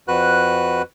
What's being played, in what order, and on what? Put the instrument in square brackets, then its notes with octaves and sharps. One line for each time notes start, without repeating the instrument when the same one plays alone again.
[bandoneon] F2 F#4 B4 F#6